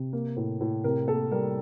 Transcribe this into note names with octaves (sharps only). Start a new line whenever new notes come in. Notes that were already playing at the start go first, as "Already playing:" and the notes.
Already playing: C3
A#3
A2
A2
C3 A#4
A#3 A4
G3 A#4